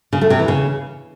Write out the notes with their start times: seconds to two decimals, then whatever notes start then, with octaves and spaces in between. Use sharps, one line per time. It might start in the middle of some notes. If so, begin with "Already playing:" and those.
0.13 C#3
0.21 A3
0.30 C3
0.39 E3
0.48 C#3